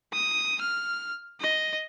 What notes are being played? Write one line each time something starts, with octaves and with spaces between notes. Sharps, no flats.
D#6
F6
D#5